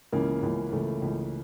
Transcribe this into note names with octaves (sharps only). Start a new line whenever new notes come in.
C#2 C#3 E3 A#3
C#2 C#3 E3
C#2 C#3 E3 A3
C#2 C#3 E3